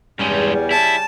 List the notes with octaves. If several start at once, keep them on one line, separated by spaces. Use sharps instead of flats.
E2 G2 C#3 G3 G#3 C#4
E4 A5